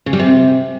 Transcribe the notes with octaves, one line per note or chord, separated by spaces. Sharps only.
C#3
G3
C3